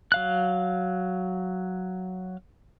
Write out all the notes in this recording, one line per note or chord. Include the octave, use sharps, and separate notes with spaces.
F#3 F5 F#6